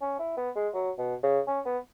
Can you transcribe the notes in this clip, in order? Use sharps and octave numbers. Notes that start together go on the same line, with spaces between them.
C#4
E4
B3
G#3
F#3
B2
C#3
C#4
B3